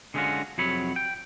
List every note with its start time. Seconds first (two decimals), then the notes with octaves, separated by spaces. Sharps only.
0.14 D3 G#3 B3 C#4 F4 F#4
0.58 F2 C3 F#3 C#5 B5
0.96 G5